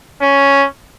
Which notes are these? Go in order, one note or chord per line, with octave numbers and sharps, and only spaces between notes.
C#4